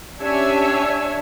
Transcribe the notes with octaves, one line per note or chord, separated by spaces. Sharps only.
C#4 D4 G4 C#5 E5 G#5